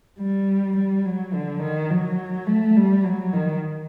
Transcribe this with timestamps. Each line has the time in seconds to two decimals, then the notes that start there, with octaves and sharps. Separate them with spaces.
0.20 G3
0.77 G3
1.05 F#3
1.34 D3
1.62 D#3
1.90 F#3
2.47 A3
2.76 G3
3.04 F#3
3.33 D#3